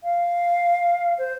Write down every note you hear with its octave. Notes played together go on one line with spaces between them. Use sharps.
F5
C5